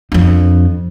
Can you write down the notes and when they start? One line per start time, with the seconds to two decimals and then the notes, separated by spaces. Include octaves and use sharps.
0.12 F2 D4